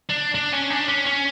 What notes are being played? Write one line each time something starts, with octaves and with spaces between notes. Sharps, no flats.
D4
D4
C#4
D4
C#4
C#4